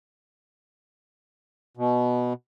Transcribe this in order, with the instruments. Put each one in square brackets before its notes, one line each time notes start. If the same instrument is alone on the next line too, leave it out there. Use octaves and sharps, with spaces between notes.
[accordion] B2